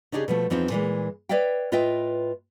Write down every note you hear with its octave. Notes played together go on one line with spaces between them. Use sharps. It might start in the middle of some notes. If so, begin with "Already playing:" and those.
C#3 D4 D#4 G4 G#4
B2 F3 A3
E2 F3 C4 D#4 F4
A#2 E3 G#3
B4 C#5 D5 E5 F5 G5
A2 F4 B4 D#5 E5 G5